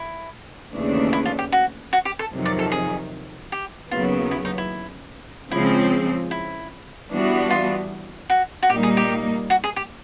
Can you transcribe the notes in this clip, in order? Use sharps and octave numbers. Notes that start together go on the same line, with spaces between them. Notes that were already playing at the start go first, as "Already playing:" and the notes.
Already playing: E4
D#2 C#3 E3 A3 D4
E4
F4
G4
F#4
F#4
G4
A4
F2 C3 D#3 F#3
D5
A4
G#4
G4
D#2 C#3 F#3 B3 F4
E4
D#4
E4
C#3 F3 G#3 C4 E4
E4
E3 G3 B3 D4 F#4
F4
F#4
F#4
A#2 G3 A#3 D#4 G4
G#4
G4
F#4
G#4
G4